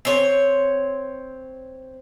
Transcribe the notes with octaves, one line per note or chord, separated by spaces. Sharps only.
C4 C#5